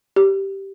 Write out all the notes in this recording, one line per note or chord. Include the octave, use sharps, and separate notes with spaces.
G4